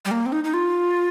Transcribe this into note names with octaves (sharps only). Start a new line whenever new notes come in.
G3
A#3
C4
D#4
D#4
F4